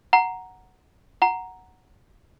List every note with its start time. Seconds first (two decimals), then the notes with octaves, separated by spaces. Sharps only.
0.13 F#5 A#5
1.22 F#5 A#5